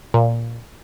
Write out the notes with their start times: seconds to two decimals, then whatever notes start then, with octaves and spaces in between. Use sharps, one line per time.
0.14 A#2